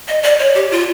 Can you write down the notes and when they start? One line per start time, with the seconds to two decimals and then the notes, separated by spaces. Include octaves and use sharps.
0.08 D#5
0.23 D5
0.39 C#5
0.55 G4
0.71 F4